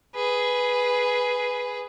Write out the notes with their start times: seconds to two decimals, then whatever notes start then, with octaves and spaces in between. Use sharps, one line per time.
0.15 G#4 B4